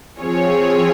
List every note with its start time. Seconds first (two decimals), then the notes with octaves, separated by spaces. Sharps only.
0.21 F3 C4 F4 G#4 C#5